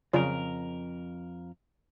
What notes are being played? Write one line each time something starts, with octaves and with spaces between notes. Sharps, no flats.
F2 C#3 F#3 F4 A#4 D5